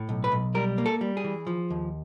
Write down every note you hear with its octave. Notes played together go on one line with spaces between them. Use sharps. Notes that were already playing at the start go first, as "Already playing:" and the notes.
Already playing: A2
B1
B4
B1
G3 A#4
A#3
A4
G3
G#4
E3
F3
D#2